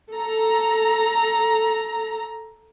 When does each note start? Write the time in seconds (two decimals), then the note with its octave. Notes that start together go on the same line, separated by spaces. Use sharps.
0.12 A4 A#5